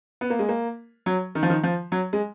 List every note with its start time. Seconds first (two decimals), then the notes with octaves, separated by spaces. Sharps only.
0.21 B3
0.30 A#3
0.39 G#3
0.49 A#3
1.06 F#3
1.35 D#3
1.43 F3
1.50 D#3
1.63 F3
1.92 F#3
2.13 G#3